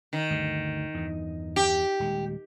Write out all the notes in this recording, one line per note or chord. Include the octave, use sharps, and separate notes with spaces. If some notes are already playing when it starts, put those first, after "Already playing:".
D#3
D2 G2 D3
E2 G2
G4
D#1 G#3